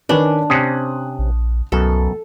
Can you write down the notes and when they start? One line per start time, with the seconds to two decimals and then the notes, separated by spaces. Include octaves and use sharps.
0.09 D#3 C#4 D4 B4
0.50 C3 C4 C#4 D#6 F#6
1.19 A#1
1.72 C2 F#2 B2 A4